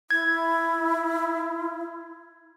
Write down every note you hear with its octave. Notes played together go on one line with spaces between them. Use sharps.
E4 G#6